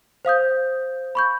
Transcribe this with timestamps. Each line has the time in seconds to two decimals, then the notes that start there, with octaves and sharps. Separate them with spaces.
0.25 C5 F5 D#6 G6
1.15 B5 C#6 G6